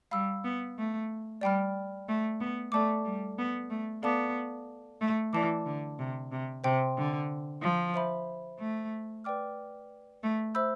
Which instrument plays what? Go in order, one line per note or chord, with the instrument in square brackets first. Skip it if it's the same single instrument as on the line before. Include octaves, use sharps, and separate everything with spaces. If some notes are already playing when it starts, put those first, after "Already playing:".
[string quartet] G3 [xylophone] F5 B5 E6
[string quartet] B3
A3
[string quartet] G3 [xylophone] D5 G5 B5 F6
[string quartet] A3
B3
[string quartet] A3 [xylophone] A4 D5 A5 D6
[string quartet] G3
B3
A3
[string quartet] B3 [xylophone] A4 D5 F5 A5 D6
[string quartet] A3
[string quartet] E3 [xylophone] D5 A5 D6
[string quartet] D3
C3
C3
[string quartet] C3 [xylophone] C5 G5 C6
[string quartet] D3
F3
[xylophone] C5 E5 B5
[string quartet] A3
[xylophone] B4 D5 G5 D6 F6
[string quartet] A3
[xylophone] C5 E5 B5 E6 G6